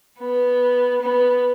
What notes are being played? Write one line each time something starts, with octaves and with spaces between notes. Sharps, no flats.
B3
B3